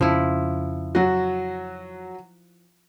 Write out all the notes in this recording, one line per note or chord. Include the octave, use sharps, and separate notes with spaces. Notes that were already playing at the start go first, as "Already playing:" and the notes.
F2 C#3 F3 E4
F#3 F#4